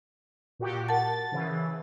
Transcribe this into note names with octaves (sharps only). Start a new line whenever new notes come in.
A#2 F#4 G4
A#4 F#5 A5 A6
C#3 E3